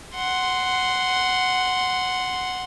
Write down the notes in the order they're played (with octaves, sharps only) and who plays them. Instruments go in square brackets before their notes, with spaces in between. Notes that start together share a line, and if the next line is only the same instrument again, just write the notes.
[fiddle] F#5 C6